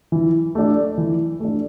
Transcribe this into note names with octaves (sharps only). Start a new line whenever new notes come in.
E3
A3 D4
E3
A3 D4